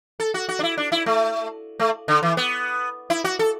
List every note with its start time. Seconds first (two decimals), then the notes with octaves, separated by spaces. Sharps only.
0.20 A4
0.34 F#4
0.49 F#4
0.59 D4
0.63 E4
0.77 D4
0.92 E4
1.06 A3
1.80 A3
2.08 D3
2.23 E3
2.37 B3
3.10 E4
3.24 F#4
3.39 A4